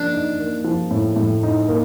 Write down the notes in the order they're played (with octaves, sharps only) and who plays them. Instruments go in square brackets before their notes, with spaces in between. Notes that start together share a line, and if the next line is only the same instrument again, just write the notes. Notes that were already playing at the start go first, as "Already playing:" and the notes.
Already playing: [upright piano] F3 A#3 [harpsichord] D4
[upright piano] D#4
A#3
F3
A2
A2
D#4
A#3